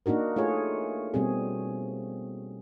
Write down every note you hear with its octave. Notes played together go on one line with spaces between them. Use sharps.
A#3 D4 D#4 F#4 A#4
A3 F4 G#4 C#5
B2 G3 C4 G#4